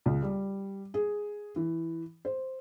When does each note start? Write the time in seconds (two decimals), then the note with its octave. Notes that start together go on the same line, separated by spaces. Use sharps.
0.06 C#2
0.23 G3
0.94 G#4
1.56 E3
2.25 C5